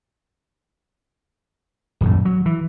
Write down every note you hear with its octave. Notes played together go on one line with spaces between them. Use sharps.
D#1 F#2 A2
F#3
E3